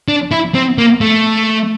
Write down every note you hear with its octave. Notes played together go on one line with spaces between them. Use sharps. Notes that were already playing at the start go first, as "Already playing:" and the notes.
D4
E4
C4
A#3
A3